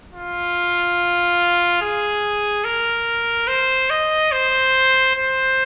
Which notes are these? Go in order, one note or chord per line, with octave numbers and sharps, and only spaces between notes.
F4
G#4
A#4
C5
D#5
C5
C5